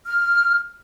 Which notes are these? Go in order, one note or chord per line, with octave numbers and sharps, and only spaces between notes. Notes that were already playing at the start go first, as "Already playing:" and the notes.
F6